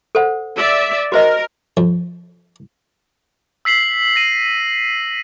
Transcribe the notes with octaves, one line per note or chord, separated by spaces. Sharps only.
A4 C5 F#5
D5 E5
F#4 A#4 C5 D#5
F2
E6 B6 C7 F#7
A#6 D#7